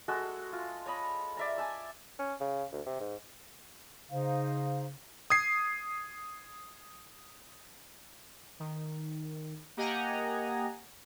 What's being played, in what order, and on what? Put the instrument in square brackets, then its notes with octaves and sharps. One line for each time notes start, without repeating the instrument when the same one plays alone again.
[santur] G#3 F#4 A4 E6
F4
C#5 D#5 B5
D5 E5 A#5
G#5 A5 E6
[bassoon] C#4
C#3
D2
C3
G#2
[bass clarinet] C#3 [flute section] D#4 C5 F5
[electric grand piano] D#6 G#6 C7
[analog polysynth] D#3
A#3 G4 D#5 F#5 G#5 A#5